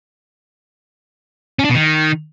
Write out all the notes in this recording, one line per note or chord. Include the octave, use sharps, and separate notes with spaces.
C#4
D4
B2
D#3